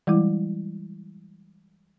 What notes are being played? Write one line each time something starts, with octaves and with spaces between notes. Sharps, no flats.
E3 G3 G#3 E4